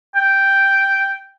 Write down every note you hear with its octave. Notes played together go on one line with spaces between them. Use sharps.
G5